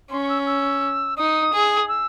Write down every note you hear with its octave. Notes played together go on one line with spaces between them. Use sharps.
C#4 C6
C#6
E6
E6
D#4 D#6
G#4
E6